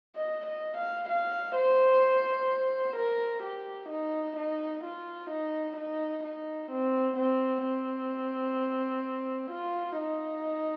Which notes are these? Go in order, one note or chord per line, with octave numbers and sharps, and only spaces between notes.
D#5
D#5
F5
F5
C5
A#4
G4
D#4
D#4
F4
D#4
D#4
D#4
C4
C4
C4
F4
D#4